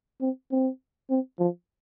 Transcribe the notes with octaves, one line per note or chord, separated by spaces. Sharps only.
C4
C4
C4
F3